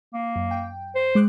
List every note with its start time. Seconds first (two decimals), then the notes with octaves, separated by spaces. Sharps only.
0.14 A#3
0.36 F#2
0.51 G5
0.95 C5
1.15 G#3 D6 F#6